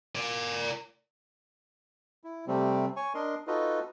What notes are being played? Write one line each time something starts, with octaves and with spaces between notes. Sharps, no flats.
A#4 D5
E4
C3 G3 A3 C4
C#5 G#5 C#6
D4 A#4 D#5 C6
D#4 F4 F#4 A4 B4 D#5